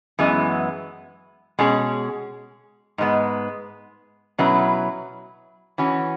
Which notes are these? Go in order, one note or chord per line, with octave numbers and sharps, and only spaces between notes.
F#2 E3 G#3 B3
B2 G#3 C#4 G#4
G#2 G#3 B3
B2 F#3 C#4 E4 B4
E3 C#4 F#4